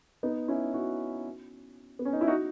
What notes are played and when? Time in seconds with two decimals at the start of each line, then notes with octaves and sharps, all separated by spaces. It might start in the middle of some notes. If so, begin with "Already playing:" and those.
0.23 B3 D#4
0.48 C#4 E4
0.74 D#4 F#4
1.99 B3
2.05 C#4
2.13 D#4
2.21 E4
2.27 D#4 F#4